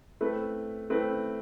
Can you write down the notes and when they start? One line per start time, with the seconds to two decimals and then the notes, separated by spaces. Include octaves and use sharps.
0.21 A3 C4 E4 B4
0.90 A3 C4 E4 B4